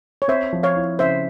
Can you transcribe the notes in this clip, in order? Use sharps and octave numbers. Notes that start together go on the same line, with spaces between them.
C#5
C4 C5 E5
F3
C#5 F5
E4
C#3 C5 E5